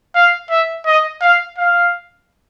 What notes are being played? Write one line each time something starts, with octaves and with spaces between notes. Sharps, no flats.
F5
E5
D#5
F5
F5